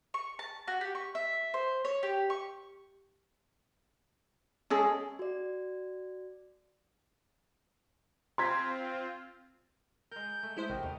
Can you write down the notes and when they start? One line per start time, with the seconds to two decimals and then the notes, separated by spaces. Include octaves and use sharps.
0.14 C#6
0.39 A5
0.68 F#4
0.81 G4
0.95 C#6
1.15 E5
1.54 C5
1.85 C#5
2.03 G4
2.30 C#6
4.70 G#3 C#4 G#4 A4 D#5
5.19 F#4 D5
8.38 C4 F4 C6 G#6 B6
10.11 G#3 A#4 G6
10.43 A3
10.56 G#3 E4 C5
10.69 A1 C3 D#3 F#4 G4
10.83 E2 G3 A3 D#4